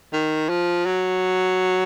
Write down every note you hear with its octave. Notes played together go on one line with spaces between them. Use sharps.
D#3
F3
F#3